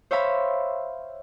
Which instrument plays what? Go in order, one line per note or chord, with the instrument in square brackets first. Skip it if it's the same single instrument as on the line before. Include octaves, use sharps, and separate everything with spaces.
[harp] C5 C#5 E5 F5 B5